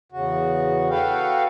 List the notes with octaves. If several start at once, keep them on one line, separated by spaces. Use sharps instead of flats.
E2 C#3 F#4
F#4 A4 B4 F5 G5